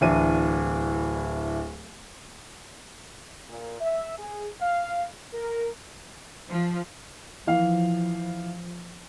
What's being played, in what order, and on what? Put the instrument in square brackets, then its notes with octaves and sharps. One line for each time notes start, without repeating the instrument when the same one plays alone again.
[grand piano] D1 E3 D4 D#7
[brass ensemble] A#2
E5
G#4
F5
A#4
[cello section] F3
[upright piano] E3 F5 [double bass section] F3